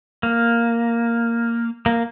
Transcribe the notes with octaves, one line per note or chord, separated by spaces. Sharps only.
A#3
A#3